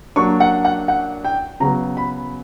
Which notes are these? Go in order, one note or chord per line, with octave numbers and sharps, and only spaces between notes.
F#3 A#3 D4 C#6
F#5
F#5
F#5
G5
C#3 F#3 B3 A#5
B5